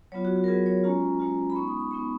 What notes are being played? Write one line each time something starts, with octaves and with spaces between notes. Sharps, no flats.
F#3 B3 F4 C#5
F#4
F#4
A#4
F#3 B3 F4 G#4
C#5
G#3 C#4 F4 A#5
G#3 C#4 F4
B5
G#3 B3 D#4 C#6
D#6
C#6
G#3 B3 D#4 B5